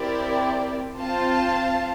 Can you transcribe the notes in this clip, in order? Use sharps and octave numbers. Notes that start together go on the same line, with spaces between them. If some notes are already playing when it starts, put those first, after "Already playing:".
Already playing: C4 E4 G4 A#4 D5
C4 F4 C5 F5 A5